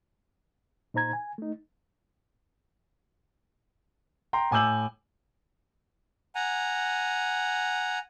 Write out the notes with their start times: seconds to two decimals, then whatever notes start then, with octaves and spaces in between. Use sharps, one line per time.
0.94 A#2 D#4 C5 A#5 G#6
1.13 G#5
1.38 A3 D#4
4.33 G5 A#5 C6
4.51 A2 G#5 D6 E6 G6 F#7
6.35 F#5 G#5 A#5